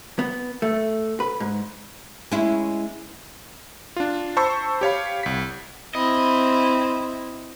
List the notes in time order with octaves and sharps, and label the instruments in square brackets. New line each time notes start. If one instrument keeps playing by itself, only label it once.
[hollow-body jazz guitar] B3
A3
B4
G#2
[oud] G#3 C#4 E4
[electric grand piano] D4 F4
C5 A5 B5 C#6 E6
G4 C#5 F5 B5
C2 B6
[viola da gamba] C4 E4 [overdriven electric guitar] D#5 [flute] B5